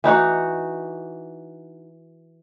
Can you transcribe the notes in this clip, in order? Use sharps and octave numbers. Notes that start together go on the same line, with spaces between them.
E3 D#4 F#4 F#5